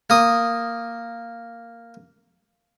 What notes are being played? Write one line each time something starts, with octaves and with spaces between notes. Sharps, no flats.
A#3 D#6